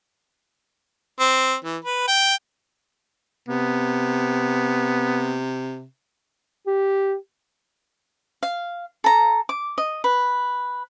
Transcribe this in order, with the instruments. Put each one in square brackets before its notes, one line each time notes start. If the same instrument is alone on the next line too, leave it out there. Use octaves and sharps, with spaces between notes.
[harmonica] C4
E3
B4
G5
[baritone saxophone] C3 [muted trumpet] B3
[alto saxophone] G4
[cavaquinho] F5
A4 A#5
D6
D#5
B4